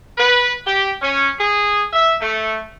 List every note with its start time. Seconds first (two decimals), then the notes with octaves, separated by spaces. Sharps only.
0.18 B4
0.65 G4
1.01 C#4
1.39 G#4
1.92 E5
2.21 A3